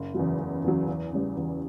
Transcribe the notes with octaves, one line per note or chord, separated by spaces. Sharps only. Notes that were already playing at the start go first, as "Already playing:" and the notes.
Already playing: F#1
E2 C#3 F#3
F#1
E2 C#3 F#3
E2
C#3 G3
E2